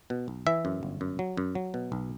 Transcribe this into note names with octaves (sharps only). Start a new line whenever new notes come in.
B2
B1
E3 E5
F#2
G1
F#2
F#3
F#2
F#3
B2
B1